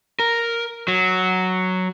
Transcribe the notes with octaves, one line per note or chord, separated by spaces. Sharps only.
A#4
F#3